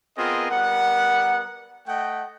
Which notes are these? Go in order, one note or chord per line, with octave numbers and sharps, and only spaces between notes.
B3 C4 F4 G#4 A#4 D#5
G3 B3 A#4 F#5
A3 D#5 F#5 G5